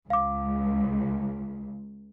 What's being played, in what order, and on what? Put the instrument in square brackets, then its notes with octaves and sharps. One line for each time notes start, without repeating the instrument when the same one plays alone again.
[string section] C#2 [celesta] F5 D6